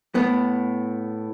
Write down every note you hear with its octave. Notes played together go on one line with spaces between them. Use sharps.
A2 B3